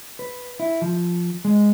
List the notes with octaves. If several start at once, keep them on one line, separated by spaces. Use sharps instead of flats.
B4
E4
F3
G#3